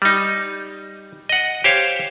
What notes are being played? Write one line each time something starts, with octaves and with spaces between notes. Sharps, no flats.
G3 D#4
D#5 F#5
G4 C5 C#5 F5